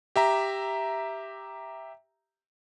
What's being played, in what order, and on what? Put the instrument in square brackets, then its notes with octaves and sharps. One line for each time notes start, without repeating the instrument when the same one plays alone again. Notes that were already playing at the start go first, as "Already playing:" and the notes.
[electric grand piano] G4 E5 A#5